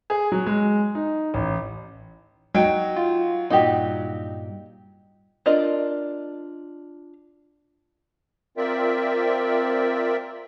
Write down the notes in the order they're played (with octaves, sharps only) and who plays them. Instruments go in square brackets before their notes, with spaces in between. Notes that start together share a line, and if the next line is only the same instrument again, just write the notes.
[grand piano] G#4
F#3
G#3
D#4
A1
[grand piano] F#3 G5 [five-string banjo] D#4
[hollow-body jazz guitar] F4
[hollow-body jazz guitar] G2 A#2 [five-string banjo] D#4 F#4 G4
[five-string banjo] D4 F4 A#4 D#5
[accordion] C4 F4 A#4 D5 E5 G5